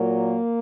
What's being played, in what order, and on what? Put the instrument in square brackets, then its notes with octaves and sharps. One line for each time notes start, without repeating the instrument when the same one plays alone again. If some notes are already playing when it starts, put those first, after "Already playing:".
Already playing: [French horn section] A#2 F#3 A#3